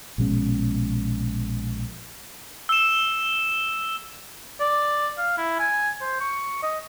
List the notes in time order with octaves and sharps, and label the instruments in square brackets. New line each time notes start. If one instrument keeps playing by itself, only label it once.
[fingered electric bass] A#1 B2 G#3 C#4
[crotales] E6 E7
[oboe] D5
F5
E4
G#5
C5
C#6
D#5